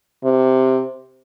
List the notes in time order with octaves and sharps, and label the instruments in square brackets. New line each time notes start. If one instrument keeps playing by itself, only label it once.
[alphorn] C3